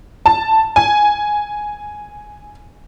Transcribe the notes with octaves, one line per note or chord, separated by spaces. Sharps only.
A5
G#5